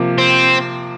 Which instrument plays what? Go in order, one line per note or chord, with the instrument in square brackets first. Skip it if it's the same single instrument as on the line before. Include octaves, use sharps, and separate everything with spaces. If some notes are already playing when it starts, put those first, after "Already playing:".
Already playing: [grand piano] C3 F3 A#3
[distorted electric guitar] C4